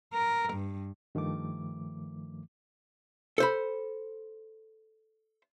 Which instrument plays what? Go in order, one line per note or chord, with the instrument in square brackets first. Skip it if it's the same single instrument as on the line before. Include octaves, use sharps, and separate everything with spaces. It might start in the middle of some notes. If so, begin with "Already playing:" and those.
[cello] A#4
G2
[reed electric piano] G2 D#3 F3 A3 D6
[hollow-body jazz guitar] A4 C5 B5